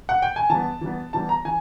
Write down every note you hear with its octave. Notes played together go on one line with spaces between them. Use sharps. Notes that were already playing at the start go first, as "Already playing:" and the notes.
F#5
G5
G#5
E3 G3 B3 A5
E3 G3 B3
E3 G3 B3 A5
A#5
E3 G#5